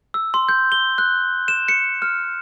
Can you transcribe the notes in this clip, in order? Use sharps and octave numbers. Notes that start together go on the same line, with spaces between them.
E6
C6
G6
G7
F#6
E7
C#7
F6